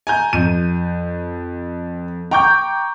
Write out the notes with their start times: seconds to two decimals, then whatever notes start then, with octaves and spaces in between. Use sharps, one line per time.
0.07 G#5 A#5 G6
0.33 F2 D#7
2.31 G5 A#5 C#6 D6 G6